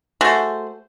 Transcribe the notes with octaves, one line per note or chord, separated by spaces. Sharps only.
A3 F#4 G#4 C5